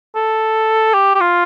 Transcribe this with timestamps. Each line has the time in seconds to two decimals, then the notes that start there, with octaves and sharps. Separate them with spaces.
0.15 A4
0.94 G4
1.15 G4
1.20 F4